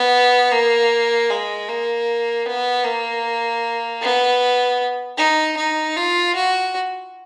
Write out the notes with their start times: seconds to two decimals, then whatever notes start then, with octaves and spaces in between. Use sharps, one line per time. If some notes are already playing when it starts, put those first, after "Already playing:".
Already playing: B3
0.52 A#3
1.30 G#3
1.68 A#3
2.46 B3
2.85 A#3
4.02 B3
5.18 D#4
5.57 D#4
5.97 F4
6.35 F#4